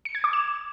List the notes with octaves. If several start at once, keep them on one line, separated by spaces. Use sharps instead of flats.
C#7
G#6
D6
E7